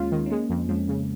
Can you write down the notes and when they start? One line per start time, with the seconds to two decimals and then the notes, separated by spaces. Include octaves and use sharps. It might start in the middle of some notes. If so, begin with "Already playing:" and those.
Already playing: D#2 G#3 A#3 C#4 F4
0.11 D#3
0.26 C#4
0.30 G#3 A#3
0.50 F2
0.69 F2 G#3 C#4
0.88 C#3